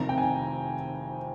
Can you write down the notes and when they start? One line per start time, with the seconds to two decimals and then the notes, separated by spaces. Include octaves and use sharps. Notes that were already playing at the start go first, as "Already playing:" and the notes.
Already playing: F1 F2 C3 D#3 A#5
0.09 G5
0.18 G#5